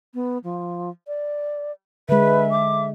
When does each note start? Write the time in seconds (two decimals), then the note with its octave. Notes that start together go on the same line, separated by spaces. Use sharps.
0.14 B3
0.44 F3
1.07 D5
2.09 D3 G#3 B4 E5
2.51 D6